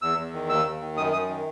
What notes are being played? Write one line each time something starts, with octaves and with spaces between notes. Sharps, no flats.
E2 E6
E2
D#3
D#2 E6
D#2
D#3
F#2 D#6
F#2 D#6
D#3